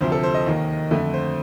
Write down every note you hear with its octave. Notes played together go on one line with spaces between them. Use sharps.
D2 C3 F3 C5
A4
C5
D#5
D#2 D#3 A#3
F2 D3 A3
C5